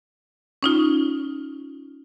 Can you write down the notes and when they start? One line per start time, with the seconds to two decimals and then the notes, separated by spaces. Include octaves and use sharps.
0.63 C#4 D#4 F4